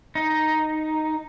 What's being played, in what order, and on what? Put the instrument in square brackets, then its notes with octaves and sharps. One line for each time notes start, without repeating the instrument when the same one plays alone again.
[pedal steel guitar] D#4